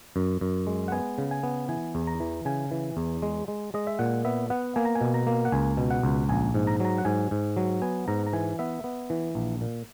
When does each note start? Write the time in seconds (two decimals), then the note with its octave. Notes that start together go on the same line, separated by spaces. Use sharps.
0.16 F#2
0.41 F#2
0.67 G#3
0.88 F#5
0.92 B3 G#5
1.18 C#3
1.31 G#5
1.43 B3
1.69 E3 G#5
1.95 E2
2.07 A#5
2.20 E3
2.45 C#3 G#5
2.71 E3
2.97 E2
3.22 G#3
3.48 G#3
3.74 G#3 D#5
3.87 E5
3.99 A#2 F#5
4.25 B3 E5
4.50 B3 F#5
4.76 A#3 G#5
4.85 A#5
4.95 G#5
5.01 B2
5.14 A#5
5.27 A#3
5.45 F#5
5.52 C#2 G#5
5.77 B2
5.91 F#5
6.03 C#2
6.29 A#1 G#5
6.54 G#2
6.67 A#5
6.80 F#3 A#5
6.98 F#5
7.05 G#2 G#5
7.31 G#2
7.57 F#3
7.82 B3 G#5
8.08 G#2 A#5
8.27 A#5
8.33 E3 G#5
8.59 B3 E5
8.84 B3
9.10 E3
9.35 A#1
9.61 A#2